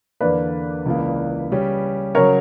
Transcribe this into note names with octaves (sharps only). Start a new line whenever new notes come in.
E2 D3 A#3 B4 D5
C#2 C#3 E3 A#3
C#3 G3 C#4 G4
C#3 F#3 A#4 C#5